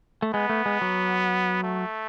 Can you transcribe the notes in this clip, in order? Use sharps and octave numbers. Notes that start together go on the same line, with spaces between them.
A3
G#3 B3
A3
G#3
F#3
A3